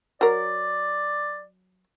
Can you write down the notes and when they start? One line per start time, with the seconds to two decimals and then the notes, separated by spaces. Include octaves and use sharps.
0.21 F#3 A#4 D5